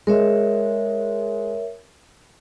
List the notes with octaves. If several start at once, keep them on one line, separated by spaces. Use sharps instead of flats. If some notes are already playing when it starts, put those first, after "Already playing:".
G#3 A#4 C#5 E5